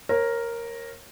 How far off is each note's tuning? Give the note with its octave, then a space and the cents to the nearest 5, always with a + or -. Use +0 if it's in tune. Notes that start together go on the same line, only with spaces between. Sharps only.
A#4 +0 C#5 -30